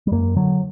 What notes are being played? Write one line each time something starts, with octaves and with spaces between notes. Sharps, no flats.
G3
F#2 A#3
D3 F#3